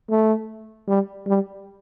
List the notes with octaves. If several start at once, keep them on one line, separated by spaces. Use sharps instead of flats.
A3
G3
G3